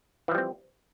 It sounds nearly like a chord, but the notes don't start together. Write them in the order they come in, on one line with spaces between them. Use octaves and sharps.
E3 F3 G3 C4